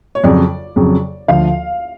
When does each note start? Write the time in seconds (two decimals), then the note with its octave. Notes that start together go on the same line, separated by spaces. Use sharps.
0.15 C#5
0.24 F2 C#3 F#3 D5
0.76 F2 C#3 F#3
1.28 D2 D3 F3 F5